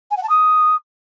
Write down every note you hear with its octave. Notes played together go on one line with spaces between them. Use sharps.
G#5
F#5
A5
D#6